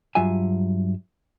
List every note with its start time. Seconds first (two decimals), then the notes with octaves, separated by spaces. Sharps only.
0.15 G2 F#3 F4 E5 G#5